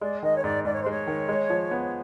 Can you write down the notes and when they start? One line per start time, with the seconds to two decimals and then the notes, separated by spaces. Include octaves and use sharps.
0.01 G#3 D5
0.22 D#3 D#5
0.36 C#5
0.43 G#2 D5
0.65 G#2 D5
0.73 C#5
0.81 C5
0.86 G#3 C#5
1.07 D#3
1.28 G#3
1.50 F3
1.71 B3